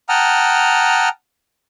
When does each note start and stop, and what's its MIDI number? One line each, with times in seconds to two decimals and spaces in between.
0.09 1.09 78
0.09 1.09 79
0.09 1.09 81
0.09 1.09 82
0.09 1.09 87
0.09 1.09 89